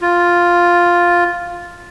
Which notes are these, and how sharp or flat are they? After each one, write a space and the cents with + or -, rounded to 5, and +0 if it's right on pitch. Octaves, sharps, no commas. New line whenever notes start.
F4 +0